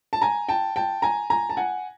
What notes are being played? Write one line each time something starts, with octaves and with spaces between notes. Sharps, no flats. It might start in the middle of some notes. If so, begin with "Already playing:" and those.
A5
G#5 A#5
G5 A5
G5 A5
G#5 A#5
G#5 A#5
A5
F#5 G#5